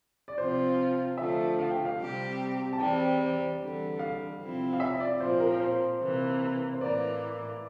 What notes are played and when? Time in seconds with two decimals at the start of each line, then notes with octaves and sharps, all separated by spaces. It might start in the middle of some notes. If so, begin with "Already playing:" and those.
0.28 D5
0.38 C3 F3 C4 F4 C5
1.18 D3 F3 A3 E5
1.59 F5
1.71 G5
1.85 F5
1.98 C3 G3 C4 G4
2.73 A5
2.78 E2 C3 G3 C4 G5
3.59 E2 D3 G3
3.99 F5
4.40 F2 C3 F3 C4 E4
4.73 F5
4.80 E5
5.00 D5
5.20 A#2 F3 C4 C5
5.40 A#4
5.60 C5
6.00 C3 E3 A#3
6.73 C5
6.81 A2 E3 A#3 D5